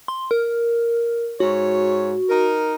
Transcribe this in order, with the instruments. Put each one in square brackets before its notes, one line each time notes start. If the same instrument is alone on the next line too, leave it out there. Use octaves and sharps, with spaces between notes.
[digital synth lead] C6
A#4
[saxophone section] G#2 C#5 [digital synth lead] F#4
[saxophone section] D#4 A#4